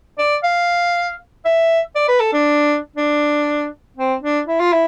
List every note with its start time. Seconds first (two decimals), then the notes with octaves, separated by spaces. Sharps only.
0.18 D5
0.43 F5
1.45 E5
1.95 D5
2.08 B4
2.20 A4
2.33 D4
2.96 D4
3.97 C4
4.22 D4
4.47 E4
4.60 F4
4.72 E4